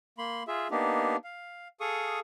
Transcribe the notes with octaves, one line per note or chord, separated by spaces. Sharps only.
A#3 B5 C6
F4 G#4 E5
A#3 B3 D4 D#4 G4
F5
G#4 A4 F5 C#6 D#6